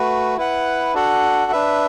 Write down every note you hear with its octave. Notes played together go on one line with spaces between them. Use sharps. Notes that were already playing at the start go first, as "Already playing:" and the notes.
Already playing: A3 F#4 B4
E4 B4 F#5
D4 F#4 A4 F#5
D4 B4 E5